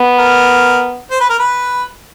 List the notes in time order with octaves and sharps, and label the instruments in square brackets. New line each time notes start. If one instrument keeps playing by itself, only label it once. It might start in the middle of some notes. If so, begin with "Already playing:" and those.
Already playing: [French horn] B3
[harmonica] A#4
C5
B4
A#4
B4